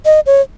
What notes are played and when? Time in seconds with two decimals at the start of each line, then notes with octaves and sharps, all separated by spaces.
0.06 D#5
0.26 C#5